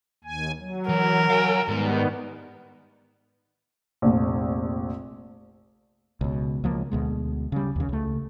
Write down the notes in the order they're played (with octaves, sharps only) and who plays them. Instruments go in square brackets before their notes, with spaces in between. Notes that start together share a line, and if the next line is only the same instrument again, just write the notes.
[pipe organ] D#2 G#5
F#3
[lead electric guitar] E3 [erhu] A#4
[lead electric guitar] F5 G#5
[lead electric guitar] G#2 [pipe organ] D#3 G3 B3
[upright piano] F1 A#1
[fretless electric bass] C#2 B2
C#2 F3 A#3
D2 B2 G#3
C#3 G3
D#2 C#3
C#2 A3